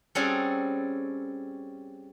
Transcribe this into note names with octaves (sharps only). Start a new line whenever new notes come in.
G3 C4 C#4 F#4 G#4 A4